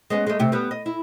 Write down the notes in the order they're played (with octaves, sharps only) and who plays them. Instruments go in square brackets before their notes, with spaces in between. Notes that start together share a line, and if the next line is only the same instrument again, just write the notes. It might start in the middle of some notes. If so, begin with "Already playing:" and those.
[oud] G#3 B3 C#4
G#3 A3
D2 C3 G4
G3 B3
D#5
E4